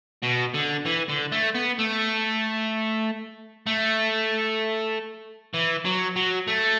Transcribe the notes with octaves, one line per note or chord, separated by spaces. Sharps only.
B2
D3
E3
D3
A3
B3
A3
A3
E3
F#3
F#3
A3